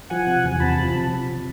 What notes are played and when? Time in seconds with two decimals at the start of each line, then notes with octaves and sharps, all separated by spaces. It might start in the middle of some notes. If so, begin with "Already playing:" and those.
0.10 F3 F#5 G#5
0.27 C3
0.44 E2
0.60 C3 A5 B5
0.77 F3
0.95 C3